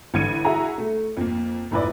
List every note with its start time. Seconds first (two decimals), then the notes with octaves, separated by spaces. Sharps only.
0.14 A1 D3 G#6 C#7 D#7
0.45 E4 F#4 G#4 E5 A#5
0.78 A3
1.17 F2 A#3
1.71 F1 A#1 E4 B4 D5